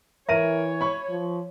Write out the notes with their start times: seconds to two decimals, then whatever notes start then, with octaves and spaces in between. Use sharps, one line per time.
0.29 E3 A#4 C#5 E5 D#7
0.81 B5 C#6
1.09 F3